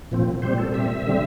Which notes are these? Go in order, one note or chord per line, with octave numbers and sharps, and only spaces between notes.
A#2 F3 C4
A#2 G3 C4 C5
A4
A#2 G3 C4 E5
D3 G3 C4